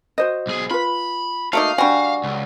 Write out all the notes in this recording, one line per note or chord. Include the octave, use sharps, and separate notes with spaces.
F#4 C5 D#5
B1 G#4
F4 B4 B5
A3 A#3 D#4 F#4 F5
G3 D4 F#4 G#5
C#2